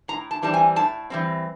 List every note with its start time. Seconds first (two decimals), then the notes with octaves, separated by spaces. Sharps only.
0.08 A2 A#5
0.31 A5
0.43 E3 G3 C4 A5
0.54 G#5
0.76 A2 A5
1.10 E3 G3 C4